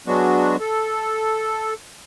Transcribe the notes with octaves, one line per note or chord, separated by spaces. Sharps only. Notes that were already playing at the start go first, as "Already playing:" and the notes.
F#3 G#3 B3 D4 F#4
A4